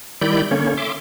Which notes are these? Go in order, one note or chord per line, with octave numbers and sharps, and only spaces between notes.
D#3 G3 E4 D5 B5 G6
D3 A#3 C#4 C#5
E5 C6 D6